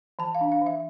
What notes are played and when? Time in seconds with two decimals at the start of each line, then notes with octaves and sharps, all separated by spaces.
0.19 E3 A5
0.35 F5
0.41 D4
0.52 F5
0.62 E3 E5